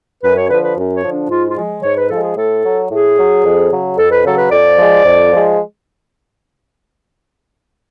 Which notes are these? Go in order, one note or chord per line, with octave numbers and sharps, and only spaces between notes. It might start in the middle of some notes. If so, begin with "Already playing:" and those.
F#2 B4
C#5
D3 F3 B4
B4
F#2
C#5
D3 F3
D4
G#2 F4
F4
F3 G#3
G#2 C#5
B4
F3 G#3 A4
G#4
A2 A4
F#3
A2 G#4
F#3
F2
C#3 F#3
F2 A4
B4
C#3 F#3 A4
B4
F2 D5
F3 G#3
F2
F3 G#3